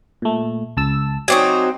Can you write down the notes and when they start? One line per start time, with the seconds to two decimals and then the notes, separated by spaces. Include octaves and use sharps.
0.22 A#2 A3
0.77 C#2 A5 E6
1.28 F#3 C4 D#4 C#5 D5 G#5